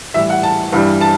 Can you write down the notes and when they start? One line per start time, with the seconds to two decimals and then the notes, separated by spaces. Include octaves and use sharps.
0.14 A2 E3 G3 E5
0.30 F#5
0.43 A5
0.72 G2 E3 G3
1.01 A5